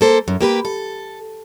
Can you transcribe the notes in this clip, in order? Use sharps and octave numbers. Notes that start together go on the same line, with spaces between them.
A#3 A4 C5
F#2
A#3 G4 A#4 B4
A4